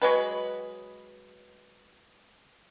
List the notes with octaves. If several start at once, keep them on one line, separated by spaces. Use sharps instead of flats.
F#3 G#3 B4